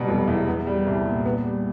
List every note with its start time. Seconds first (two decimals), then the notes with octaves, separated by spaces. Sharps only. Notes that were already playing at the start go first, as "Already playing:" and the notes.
Already playing: B2 F#3 G3
0.08 F1
0.27 E2
0.48 B3
0.67 G3
0.86 C2
1.06 A#2
1.26 B3
1.44 G3